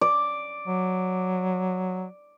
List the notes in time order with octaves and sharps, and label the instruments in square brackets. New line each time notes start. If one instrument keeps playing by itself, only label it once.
[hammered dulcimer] D5
[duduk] F#3